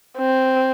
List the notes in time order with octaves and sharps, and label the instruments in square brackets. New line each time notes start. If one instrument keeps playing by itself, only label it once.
[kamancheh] C4